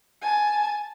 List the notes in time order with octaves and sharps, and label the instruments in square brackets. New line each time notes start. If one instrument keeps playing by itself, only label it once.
[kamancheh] G#5 A5